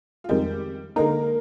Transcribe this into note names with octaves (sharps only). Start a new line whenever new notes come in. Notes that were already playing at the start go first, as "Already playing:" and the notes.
F4
F2 D#3 G3 G#3 G4
D3 G#3 A#3 D#4 A#4